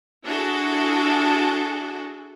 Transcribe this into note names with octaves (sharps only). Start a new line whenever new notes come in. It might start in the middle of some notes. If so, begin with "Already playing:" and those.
D4 E4 F#4 G#4 A4